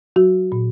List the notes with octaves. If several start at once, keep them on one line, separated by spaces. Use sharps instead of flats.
F#3 F#4
A#2